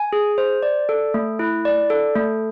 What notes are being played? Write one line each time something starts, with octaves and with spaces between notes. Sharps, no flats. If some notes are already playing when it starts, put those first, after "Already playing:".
Already playing: G#5
G#4
C5
D5
A4
A3
E4
D5
A4
A3